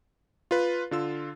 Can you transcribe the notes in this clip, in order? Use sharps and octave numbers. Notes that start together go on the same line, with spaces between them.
F4 B4
D3 F4 E6